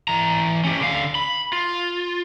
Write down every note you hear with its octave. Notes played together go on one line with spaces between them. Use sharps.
E3 A#5
C#4 G4
D3 F5
B5
F4